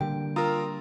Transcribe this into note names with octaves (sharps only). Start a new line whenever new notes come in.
D3 G3 A#3 G5
F4 A#4 A#5 D#6 E6